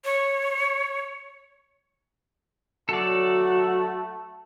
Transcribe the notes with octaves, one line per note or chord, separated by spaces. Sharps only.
C#5
F#3 A3 F#4 A4 D5